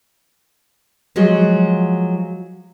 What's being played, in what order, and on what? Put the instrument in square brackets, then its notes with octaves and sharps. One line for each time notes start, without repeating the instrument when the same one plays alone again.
[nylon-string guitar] F3 F#3 G#3 F#4